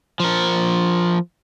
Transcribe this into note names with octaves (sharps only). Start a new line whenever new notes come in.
F3 A#4